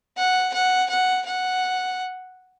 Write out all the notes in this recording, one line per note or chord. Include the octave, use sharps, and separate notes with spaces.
F#5
F#5
F#5
F#5